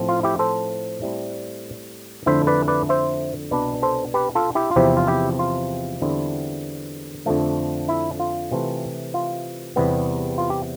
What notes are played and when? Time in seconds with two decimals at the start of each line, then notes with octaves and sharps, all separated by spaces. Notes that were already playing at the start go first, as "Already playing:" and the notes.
Already playing: A2 F3 C4
0.09 F4
0.23 E4 G4
0.39 A4 C5
1.02 A2 G3 C4 E4
2.26 F2 D3 A3 E4 C5 E5
2.47 B4 D5
2.68 B4 D5
2.89 C5 E5
3.51 C2 B2 B3 D4 B4 D5
3.82 A4 C5
4.14 G4 B4
4.35 F4 A4
4.55 E4 G4
4.71 F4
4.76 E2 C3 F3 C4 E4 G4
4.97 F4
5.07 E4 G4
5.39 F4
6.01 E2 D3 G3 C4 E4
7.26 F2 D3 F3 A3
7.89 E4
8.20 F4
8.51 C3 E3 A3
9.14 F4
9.76 E2 C3 G3 B3
10.38 F4
10.50 G4